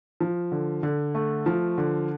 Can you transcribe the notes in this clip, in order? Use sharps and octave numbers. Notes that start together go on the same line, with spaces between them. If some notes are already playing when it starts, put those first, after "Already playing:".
F3
D3
D3
A3
F3
D3